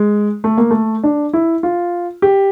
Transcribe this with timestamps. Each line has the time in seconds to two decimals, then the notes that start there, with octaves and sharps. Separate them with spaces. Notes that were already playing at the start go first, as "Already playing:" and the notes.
Already playing: G#3
0.44 A3
0.58 A#3
0.71 A3
1.04 D4
1.33 E4
1.63 F4
2.22 G4